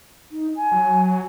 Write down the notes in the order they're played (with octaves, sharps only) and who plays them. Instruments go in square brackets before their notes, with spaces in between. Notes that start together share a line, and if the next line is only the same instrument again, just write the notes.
[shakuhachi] D#4
G#5
[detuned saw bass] F#3